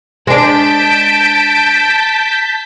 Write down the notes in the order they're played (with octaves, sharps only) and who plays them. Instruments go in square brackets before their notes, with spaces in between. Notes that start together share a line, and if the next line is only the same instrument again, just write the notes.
[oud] G#3 D4 [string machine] A5 G6 B6 [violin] D7 E7